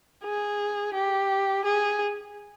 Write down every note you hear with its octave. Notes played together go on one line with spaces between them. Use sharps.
G#4
G4
G#4